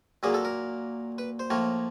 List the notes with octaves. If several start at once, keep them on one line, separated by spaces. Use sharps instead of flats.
A#2 F#3 A#3 G#4
A4
A#4
B4
C5
A2 F3 A#3 C#5